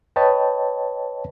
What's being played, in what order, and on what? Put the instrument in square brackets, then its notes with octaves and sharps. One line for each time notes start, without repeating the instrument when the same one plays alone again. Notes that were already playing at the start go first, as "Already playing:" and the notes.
[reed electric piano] B4 C#5 D#5 G5 A5